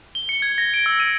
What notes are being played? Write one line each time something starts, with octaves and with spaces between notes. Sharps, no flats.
G7
C#7
G#6
A#6
D7
E6
D#7